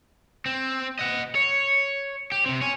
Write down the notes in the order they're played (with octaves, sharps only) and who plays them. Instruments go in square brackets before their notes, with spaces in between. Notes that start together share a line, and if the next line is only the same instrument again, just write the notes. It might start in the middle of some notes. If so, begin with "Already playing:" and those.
[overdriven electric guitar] C4
D#5 F#5
C#5
G4
C3 C4
C#5 G#5